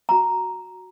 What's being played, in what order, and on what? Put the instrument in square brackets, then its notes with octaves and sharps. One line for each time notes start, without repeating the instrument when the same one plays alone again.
[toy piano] F#4 A#5